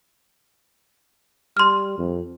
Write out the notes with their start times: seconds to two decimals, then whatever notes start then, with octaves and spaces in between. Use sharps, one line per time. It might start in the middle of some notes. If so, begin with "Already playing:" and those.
1.57 G3 C6 F6
1.98 F2